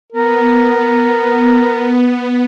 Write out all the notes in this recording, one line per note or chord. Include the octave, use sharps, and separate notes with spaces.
B3 A#4